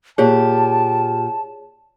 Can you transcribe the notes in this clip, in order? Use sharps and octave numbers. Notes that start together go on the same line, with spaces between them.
A#2 G4 G#4 C#5 D5 A5